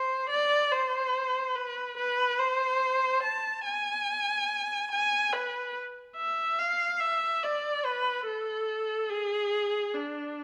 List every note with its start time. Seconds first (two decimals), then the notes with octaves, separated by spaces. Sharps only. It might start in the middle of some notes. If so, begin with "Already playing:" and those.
Already playing: C5
0.30 D5
0.72 C5
1.55 B4
1.97 B4
2.39 C5
3.23 A5
3.65 G#5
4.91 G#5
5.33 B4
6.17 E5
6.59 F5
7.00 E5
7.43 D5
7.85 B4
8.26 A4
9.10 G#4
9.94 D4